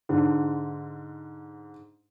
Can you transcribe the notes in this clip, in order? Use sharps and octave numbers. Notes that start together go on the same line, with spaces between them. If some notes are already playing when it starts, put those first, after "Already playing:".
G#2 D3